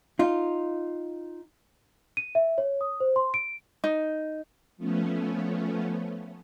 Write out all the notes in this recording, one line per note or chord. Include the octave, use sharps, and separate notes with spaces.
D#4 F4
D#7
E5
C#5
D#6
C5
C6
D7
D#4
F3 A3 B3 C#4